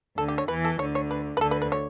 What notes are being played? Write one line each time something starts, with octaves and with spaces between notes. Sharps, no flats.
D2 D3 A4
G4
C#5
E2 E3 B4
A4
D2 D3 C#5
C#5
B4
B4
D2 D3 A4
B4
B4
C#5